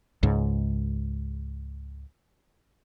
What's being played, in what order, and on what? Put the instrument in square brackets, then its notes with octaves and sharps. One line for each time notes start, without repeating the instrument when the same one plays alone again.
[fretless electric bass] C#2 G#2